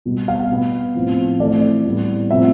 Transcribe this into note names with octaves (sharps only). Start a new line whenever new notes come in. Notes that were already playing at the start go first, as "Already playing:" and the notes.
B2 G3 B3
F5
B2 B3
A2 F3 C4
E3 A3 C4 D5
A2 G3 B3
C3 F3 A3 C4 E5